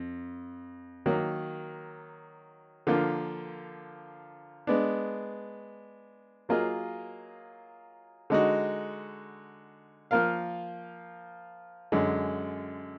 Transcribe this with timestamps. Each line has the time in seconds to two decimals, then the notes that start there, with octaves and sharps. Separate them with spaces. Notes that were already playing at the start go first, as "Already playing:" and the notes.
Already playing: F2
1.06 D#3 F#3 A#3
2.87 D3 F3 A#3 F4
4.67 G#3 B3 D4
6.49 F#3 A#3 F4 G#4 D#5
8.30 D3 G#3 D#4 F#4
10.11 F3 A#3 F4 A#4 F5
11.92 F#2 D3 G#3